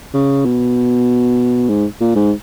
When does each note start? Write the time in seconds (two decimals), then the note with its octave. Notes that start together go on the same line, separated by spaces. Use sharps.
0.14 C#3
0.45 B2
1.69 G#2
2.00 A#2
2.15 G#2